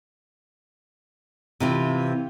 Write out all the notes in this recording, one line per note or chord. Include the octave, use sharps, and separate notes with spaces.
C3 E3 F4